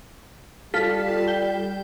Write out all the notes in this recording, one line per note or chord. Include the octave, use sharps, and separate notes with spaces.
G3 F4 A4 B6
G5